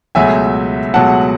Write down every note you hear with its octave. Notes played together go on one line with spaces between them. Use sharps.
C#2 B2 F#3 A3 E5 G#5
C#2 B2 F#3 A3 F#5 A5